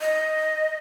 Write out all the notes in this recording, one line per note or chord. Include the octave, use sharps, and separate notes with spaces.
D#5